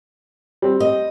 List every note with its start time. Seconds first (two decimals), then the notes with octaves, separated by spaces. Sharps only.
0.62 G3 C4
0.80 D#5